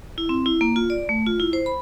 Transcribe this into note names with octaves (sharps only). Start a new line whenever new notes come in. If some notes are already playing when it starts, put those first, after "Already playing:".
E4
C4
E4
A#3
F4
D5
A3
F4
E4
C5
B5